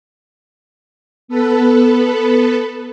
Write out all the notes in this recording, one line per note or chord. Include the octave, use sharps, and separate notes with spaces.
B3 A4 B4